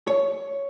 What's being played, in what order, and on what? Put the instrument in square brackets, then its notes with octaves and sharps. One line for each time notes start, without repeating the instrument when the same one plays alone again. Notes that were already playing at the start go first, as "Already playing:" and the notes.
[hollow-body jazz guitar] C#5